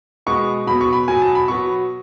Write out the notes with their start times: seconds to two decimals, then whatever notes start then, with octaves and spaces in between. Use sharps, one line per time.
0.26 B2 G#3 B3 C#6
0.67 B2 F#3 B3 B5
0.81 C#6
0.93 B5
1.08 B2 F#3 B3 G#5
1.22 A5
1.35 B5
1.48 B2 F#3 B3 C#6